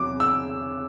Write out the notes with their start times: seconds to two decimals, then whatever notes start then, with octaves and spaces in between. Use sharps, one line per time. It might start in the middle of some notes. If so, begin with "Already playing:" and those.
Already playing: E2 C3 F#3 D6
0.20 E6